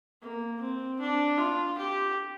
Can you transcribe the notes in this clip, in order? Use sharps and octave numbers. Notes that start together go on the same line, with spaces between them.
A#3
C4
D4
F4
G4